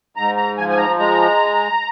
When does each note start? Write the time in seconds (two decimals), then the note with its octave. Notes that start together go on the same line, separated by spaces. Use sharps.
0.16 G#2 A#5
0.37 A#5
0.57 F3 G#5
0.69 G#5
0.78 A#5
0.99 G#3 A#5